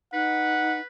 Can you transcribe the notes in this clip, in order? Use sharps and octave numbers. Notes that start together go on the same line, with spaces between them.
D#4 B4 F#5